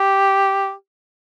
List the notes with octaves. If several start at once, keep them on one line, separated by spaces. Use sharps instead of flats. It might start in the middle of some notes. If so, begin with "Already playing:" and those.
Already playing: G4